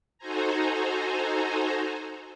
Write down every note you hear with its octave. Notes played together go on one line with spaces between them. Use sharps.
D#4 F#4 A4 C5 G#5 A#5